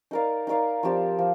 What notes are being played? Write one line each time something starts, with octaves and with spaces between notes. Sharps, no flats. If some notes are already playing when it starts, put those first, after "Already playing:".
D#4 A#4 D5 F5
D#4 A#4 D5 F5
F3 C4 G4 D5
F3